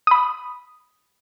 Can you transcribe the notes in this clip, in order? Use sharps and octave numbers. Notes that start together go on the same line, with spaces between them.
B5 D#6